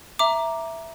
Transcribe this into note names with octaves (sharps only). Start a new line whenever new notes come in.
E5 A#5 D6